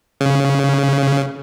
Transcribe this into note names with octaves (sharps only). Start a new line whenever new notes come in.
C#3